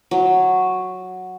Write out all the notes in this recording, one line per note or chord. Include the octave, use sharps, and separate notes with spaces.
F#3